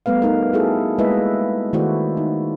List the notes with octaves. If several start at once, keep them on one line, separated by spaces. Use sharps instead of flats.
G3 A3 B3 B4 F5
A3 D#4 A#4
A3 E4 F#4 G#4 A4
G#3 A#3 E4 B4 D#5 E5
D#3 A3 E4 F#4 C5 D5
D#4